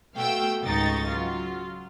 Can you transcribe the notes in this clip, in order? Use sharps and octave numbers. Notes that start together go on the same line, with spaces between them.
B2 A3 F5 G5 E6
C#2 G#2 D#3 D#4 C#6 A6
F#3 F4